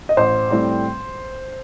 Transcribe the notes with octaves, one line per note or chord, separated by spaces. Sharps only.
D#5
A1 C5
A2 G3 C4